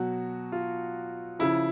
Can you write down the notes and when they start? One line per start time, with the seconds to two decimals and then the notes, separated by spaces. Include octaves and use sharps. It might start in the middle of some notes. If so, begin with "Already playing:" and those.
Already playing: B2 F#3 F#4
0.52 F4
1.39 C#3 F3 E4